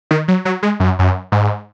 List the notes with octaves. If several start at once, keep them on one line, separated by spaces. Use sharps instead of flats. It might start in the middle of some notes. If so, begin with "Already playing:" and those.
D#3
F#3
F#3
G#3
F#2
F#2
G#2